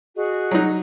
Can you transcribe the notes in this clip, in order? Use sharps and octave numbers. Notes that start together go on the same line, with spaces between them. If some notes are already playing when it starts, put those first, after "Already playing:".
F#4 G#4 D#5
F#3 D#4